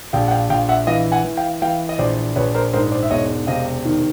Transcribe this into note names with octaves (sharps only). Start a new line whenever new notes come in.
A#1 F5 G5
F#5
F5 G5
A#1 F5 G5
E5 F#5
E3 D#5 F5
F#5 G#5
E3
F5 G5
E3 F5 G5
D#5
A#1 C5 D5
A#1 B4 C#5
A#4 C5
G#2 A#4 C5
C5 D5
E5
E1 C#5 D#5
C3 D#5 F5
D#3